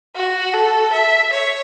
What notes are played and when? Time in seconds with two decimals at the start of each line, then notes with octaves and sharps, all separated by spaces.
0.16 F#4
0.54 A4
0.93 E5
1.33 C#5